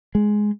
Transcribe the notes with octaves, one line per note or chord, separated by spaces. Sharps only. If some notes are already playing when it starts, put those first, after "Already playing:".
G#3